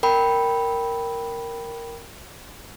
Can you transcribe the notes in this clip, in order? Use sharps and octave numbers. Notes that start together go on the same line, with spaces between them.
A#4 G5 B5